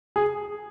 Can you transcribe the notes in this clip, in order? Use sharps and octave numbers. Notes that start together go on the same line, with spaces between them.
G#4